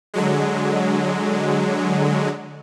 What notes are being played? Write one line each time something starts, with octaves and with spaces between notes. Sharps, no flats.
D3 F#3 G#3